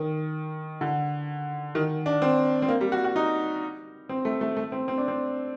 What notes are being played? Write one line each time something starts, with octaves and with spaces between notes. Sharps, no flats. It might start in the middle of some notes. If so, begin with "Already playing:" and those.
Already playing: D#3
D3
D#3
D4
C4
C4
A#3
G3
F#4
F#4
D#4
C4
A3
A3
A3
C4
C4
D4
C4